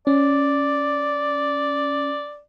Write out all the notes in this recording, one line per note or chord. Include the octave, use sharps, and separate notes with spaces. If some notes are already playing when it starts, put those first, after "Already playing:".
C#4 D5